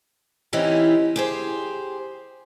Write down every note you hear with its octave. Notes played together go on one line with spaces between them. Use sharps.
E3 C4 C#4 D#4 E4 G4
G4 G#4 C5